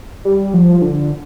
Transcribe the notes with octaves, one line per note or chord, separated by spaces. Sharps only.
G3
F3
D3